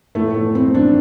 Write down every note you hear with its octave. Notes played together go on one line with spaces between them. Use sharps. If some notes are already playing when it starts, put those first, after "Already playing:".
A2 A3
A3
E3
C4
B1
D4